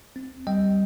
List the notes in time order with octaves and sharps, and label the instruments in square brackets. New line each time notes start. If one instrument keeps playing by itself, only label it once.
[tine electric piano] C4
G3 D#5 G5